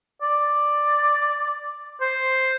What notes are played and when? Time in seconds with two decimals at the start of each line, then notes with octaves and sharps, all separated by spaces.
0.22 D5
2.01 C5